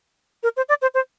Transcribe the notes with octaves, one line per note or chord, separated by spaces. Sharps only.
A#4
C5
D5
C5
C5